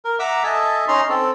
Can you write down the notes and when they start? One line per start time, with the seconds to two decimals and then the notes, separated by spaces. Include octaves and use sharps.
0.05 A#4
0.19 E5 F#5 A#5 D6 E6
0.44 A4 D#5 E5 G#5 A5
0.88 C#4 D#4 A#5 C6
1.09 C4 A4